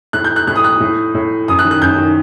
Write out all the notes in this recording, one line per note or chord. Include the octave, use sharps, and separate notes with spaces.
A2 F#6
G6
F#6
A2 F#6
D#6
F#6
A2
A2
F#2 D#6
F#6
D#3
F#6
F#2 G6
D#3